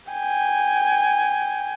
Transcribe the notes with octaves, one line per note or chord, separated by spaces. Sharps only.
G5 G#5